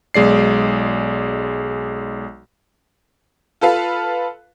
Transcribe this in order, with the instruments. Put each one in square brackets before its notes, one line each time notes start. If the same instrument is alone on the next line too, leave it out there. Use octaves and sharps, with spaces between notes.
[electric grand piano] B1 G#3 D5 C7
[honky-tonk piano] F4 A4 B4 F5